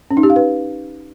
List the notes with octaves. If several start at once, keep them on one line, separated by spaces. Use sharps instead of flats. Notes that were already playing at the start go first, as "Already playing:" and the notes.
C#4
D#4
G4
F5
B4